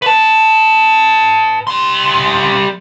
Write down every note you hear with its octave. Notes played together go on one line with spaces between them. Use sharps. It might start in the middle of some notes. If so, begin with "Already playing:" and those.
B4 A5
G3 C6